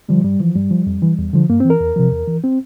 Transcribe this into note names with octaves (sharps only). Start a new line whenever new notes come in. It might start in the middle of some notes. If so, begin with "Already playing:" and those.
D3 F3 G3
G2 G3
E3 F3
G2 G3
F3
F2
E3
E2
D3 F3
G2 A#3
C4
E3
A#4
E2
C3 F3
E2
E3
C4